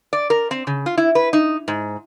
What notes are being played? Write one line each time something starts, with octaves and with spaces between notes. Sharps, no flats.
D5
A#4
C4
C#3
F4
E4
B4
D#4
G#2